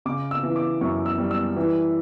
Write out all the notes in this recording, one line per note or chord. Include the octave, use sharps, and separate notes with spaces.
C#3 D6
E6
E3
D6
F#2 C#6
E6
G3
E6
E3